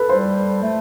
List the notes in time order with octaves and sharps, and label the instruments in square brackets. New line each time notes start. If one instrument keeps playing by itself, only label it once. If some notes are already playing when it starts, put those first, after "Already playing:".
Already playing: [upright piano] A4 B4
[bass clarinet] G3 [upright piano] C5
[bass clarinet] A3